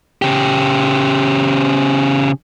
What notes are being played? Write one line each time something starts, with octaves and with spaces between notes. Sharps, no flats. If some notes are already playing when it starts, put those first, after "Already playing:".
C#3 G4